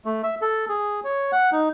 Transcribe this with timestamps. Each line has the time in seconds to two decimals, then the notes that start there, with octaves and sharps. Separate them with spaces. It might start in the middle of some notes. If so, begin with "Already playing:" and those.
0.05 A3
0.23 E5
0.41 A4
0.69 G#4
1.04 C#5
1.32 F#5
1.52 D#4